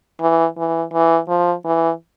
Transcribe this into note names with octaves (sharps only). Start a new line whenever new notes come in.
E3
E3
E3
F3
E3